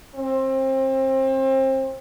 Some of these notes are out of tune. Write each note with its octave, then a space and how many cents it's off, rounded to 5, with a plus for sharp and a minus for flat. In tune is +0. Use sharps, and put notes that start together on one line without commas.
C4 +30